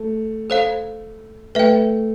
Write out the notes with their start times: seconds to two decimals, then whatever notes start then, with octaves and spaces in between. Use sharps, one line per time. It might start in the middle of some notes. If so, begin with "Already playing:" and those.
Already playing: A3
0.50 A4 C5 F5
1.55 A3 B4 E5 G5